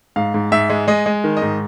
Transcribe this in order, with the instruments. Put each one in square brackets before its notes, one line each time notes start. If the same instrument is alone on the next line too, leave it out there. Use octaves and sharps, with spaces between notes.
[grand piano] G#2 F5
G#2
G#2 E5
G#3
G#3 D#5
G#3
D#3
D#5
G#2